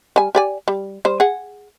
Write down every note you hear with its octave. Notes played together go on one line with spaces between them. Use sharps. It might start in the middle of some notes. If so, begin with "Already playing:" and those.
G3 G#5
G4 D5 G#5
G3
G3 C5
G#4 F#5